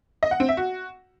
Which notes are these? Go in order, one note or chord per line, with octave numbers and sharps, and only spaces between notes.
D#5
F#5
C4
E5
F#4